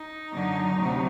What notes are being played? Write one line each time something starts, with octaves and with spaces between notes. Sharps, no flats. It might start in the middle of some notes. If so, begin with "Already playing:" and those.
Already playing: D#4
F#2 D3 F#3
D2 C3 F#3